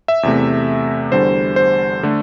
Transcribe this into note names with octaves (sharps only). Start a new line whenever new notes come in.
E5
E2 C3 A3
E2 D3 G3 C5
C5
D3 A3